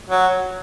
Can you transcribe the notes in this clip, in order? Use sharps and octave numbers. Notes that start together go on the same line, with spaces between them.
F#3